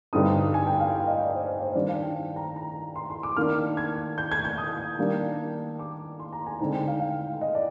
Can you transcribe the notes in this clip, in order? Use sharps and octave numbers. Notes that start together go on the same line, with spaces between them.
G2 D3 G3 C4 D#4 D#6
G#5
G5
F5
F5
D#5
D5
C5
C5
D#3 G3 D4 D5
F5
G5
A#5
A#5
C6
C6
D6
D#3 A#3 D4 F6
G#6
G6
G#6
G6
D#6
D#3 G3 A#3 D4
D6
C6
A#5
G#5
D3 G#3 C4 D#4 A#5
G5
F5
F5
D#5
D5